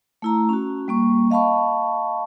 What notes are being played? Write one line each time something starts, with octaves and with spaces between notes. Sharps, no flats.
A3 E4 A#5
C#4 F#4
G3 A#3 C#6
D#5 F5 A5 B5 C#6